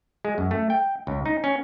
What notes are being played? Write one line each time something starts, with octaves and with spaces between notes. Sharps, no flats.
G#3
F#2
A3
G5
C#2
D#4
C#4